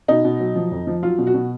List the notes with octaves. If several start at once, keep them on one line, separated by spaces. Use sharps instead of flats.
B2 D#4
B2
F#3
F3
F2
F3
F#3 F4
B2
F#4
B2